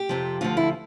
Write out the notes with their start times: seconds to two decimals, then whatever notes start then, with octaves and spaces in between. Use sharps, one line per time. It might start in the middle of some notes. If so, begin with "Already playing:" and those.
Already playing: G4
0.09 F2 C3 F3
0.41 D2 D3 F3 F4
0.57 E4